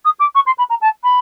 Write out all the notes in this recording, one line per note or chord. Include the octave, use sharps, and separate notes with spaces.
D#6
D6
C#6
C6
B5
A#5
A5
B5